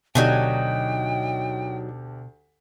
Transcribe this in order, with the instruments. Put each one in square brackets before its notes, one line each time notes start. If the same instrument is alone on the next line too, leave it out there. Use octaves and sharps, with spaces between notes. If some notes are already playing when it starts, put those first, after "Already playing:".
[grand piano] D2 D4 G4 [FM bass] B2 [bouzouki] F#3 D#4 G#5 [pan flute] G5